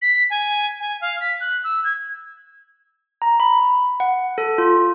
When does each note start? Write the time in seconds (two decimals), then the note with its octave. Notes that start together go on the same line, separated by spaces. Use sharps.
0.02 B6
0.30 G#5
0.80 G#5
1.01 F5
1.21 B6
1.41 F#6
1.64 E6
1.84 G#6
3.22 A#5
3.40 B5
4.00 F#5
4.38 A4
4.58 F4